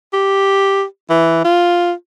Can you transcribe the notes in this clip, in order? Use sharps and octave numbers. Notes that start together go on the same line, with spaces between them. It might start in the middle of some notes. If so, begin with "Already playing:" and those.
G4
E3
F4